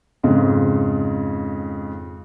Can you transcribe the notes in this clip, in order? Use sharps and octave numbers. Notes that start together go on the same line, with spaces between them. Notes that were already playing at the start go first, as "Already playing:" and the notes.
F2 G#2 C#3